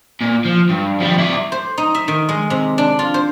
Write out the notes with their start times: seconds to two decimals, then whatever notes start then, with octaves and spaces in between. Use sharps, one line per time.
0.21 A#2
0.45 F3
0.70 G2
1.00 F3 G3
1.18 E4 D5
1.52 C5
1.78 D#4
1.95 E5
2.08 D#3
2.29 G#3
2.50 C3
2.78 D4
2.99 F4
3.14 C5